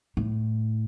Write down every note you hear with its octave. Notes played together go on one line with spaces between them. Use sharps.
A2